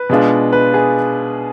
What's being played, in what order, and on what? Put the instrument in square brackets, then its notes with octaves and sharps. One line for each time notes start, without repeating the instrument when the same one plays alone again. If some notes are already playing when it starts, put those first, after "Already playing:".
Already playing: [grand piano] B4
[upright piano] B2 G#3 D4 F4
[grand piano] B4
G#4